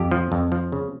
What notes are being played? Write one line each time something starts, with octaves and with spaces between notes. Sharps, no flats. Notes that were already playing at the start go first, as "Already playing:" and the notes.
Already playing: F2 G4
F3
F2
F3
C#3